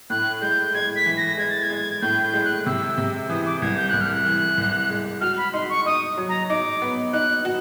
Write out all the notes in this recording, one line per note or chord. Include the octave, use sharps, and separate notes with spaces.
A2 F#6
G#3 G6
G#3 G#6
B6
E3
A#6
G#3 G#6
A6
G#6
G#3
A2 G6
G6
G#3
F#6
C3 E6
C3
E3 D#6
D6
C2 G#6
G6
C2 F#6
F6
F#6
E3
C2
G#3
F#4 F6
B5
D#4 C6
C#6
D#4 D#6
F#3
A#5
D#4 D6
B3
D#4 F#6
F#4